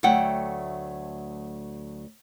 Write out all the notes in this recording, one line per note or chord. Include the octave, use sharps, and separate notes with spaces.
D2 F#3 A3 F#5 G5